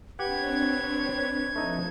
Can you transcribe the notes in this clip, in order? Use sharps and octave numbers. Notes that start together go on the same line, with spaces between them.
C4 D4 G4 B4 C#5 F#5 G#6
F3 A3 D#4 A4